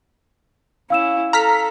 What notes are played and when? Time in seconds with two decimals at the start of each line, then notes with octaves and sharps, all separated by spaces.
0.90 C#4 E4 F5 E6 E7
1.33 A4 A#5 F6 B6